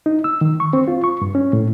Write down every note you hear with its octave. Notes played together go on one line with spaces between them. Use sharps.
D#4
E6
D#3
C#6
C4
F4
C#6
G2
C#4
A2